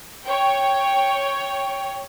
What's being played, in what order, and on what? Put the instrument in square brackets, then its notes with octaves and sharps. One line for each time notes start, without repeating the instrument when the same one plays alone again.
[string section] C#5 G5